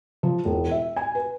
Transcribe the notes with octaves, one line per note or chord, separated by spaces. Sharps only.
F3
E1
E5
G#5
B4